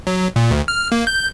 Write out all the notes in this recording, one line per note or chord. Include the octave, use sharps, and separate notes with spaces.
F#3
A#2
D2
F6
A#3
G6